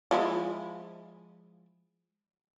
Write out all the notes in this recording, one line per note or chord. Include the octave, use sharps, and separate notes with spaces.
F3 G#3 E4